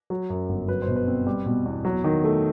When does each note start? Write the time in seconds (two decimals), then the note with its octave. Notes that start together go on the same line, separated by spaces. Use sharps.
0.10 F#3
0.30 F#2
0.49 G1
0.68 F#3 B4
0.82 C5
0.88 B2
0.96 B4
1.08 C4
1.27 G3
1.46 B2
1.66 E2
1.85 F#3
2.04 D#3
2.24 A3